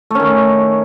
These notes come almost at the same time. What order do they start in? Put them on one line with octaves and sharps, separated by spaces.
A3 C#4 D#3